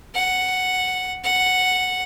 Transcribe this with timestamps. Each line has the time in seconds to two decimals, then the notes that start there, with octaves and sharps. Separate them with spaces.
0.15 F#5
1.24 F#5